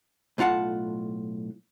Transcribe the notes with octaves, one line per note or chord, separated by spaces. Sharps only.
B1 A2 F4 F#5 A5